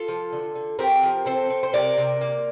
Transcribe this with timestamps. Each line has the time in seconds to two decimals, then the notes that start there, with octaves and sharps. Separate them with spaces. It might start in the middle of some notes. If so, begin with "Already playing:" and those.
Already playing: F4 A4
0.08 F3
0.33 D3
0.55 D3
0.79 C4 G4 A#4
1.03 F3
1.26 C4 A4 C5
1.50 C4
1.63 C5
1.73 C3 A#4 D5
1.97 C3
2.21 A#3